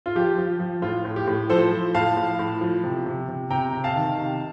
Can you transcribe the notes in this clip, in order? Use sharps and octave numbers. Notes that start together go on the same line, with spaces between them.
F4
F3 G4
F3
F3
A2 F4
A2
G4
A2
F3 A4 C5
F3
A2 F5 A5
A2
A2
F3
C3
C3
C3
C3 G5 A#5
C3
F5 A5
D#3
C3